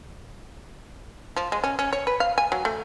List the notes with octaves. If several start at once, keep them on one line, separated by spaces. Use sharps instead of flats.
F3
G#3
C#4
C#4
C#5
B4
F5
G#5
F#3
A3